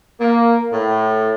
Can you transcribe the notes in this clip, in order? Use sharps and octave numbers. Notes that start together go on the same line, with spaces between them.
A#3
A2